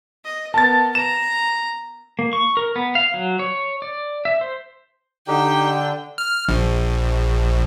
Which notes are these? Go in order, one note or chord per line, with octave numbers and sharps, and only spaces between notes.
D#5
B3 A#4 A5 A6
A#5 E7
A#3
C#6
A#4
B3
F5
F#3
C#5
D5
E5
C5
D3 D#4 G4 G5
F6
A#1